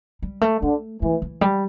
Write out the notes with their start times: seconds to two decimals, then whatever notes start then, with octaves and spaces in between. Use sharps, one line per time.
0.22 G3
0.41 A3
0.61 D3 A3
1.02 E3 A3
1.22 E3
1.41 G3